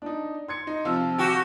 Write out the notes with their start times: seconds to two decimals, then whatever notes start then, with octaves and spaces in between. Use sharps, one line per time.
0.02 D4 D#4
0.48 C6 G#6 C#7
0.67 D#4
0.85 C3 F3 F4 E6
1.18 F#4 G4